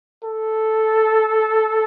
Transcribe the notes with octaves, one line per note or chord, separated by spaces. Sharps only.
A4